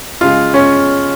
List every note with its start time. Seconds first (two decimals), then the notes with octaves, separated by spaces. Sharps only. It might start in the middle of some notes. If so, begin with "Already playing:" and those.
0.21 C#3 G#3 F4
0.54 C#4